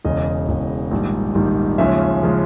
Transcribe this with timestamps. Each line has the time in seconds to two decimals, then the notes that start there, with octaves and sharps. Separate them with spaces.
0.04 E1 E2 C#3 D#5
0.48 E1 E2 C#3
0.91 A#1 G#2 D#3 G3
1.35 A#1 G#2 D#3 G3
1.78 D#2 C#3 F3 G#3 C#4 E5
2.23 C#3 F3 G#3 C#4